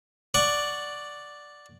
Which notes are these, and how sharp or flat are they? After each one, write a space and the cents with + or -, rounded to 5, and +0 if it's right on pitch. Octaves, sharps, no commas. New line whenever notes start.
D5 +0 F#5 +0 C#6 +0